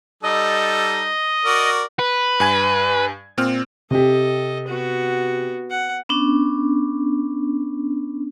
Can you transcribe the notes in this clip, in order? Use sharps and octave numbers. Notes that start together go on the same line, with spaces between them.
G3 D#4 A4 D#5
F#4 A#4 D5
B4
G2 G#5 G#6
A#2 C4 F6
C3 G4 A4 D#5
B3 F#4
F#5
B3 C#4 D4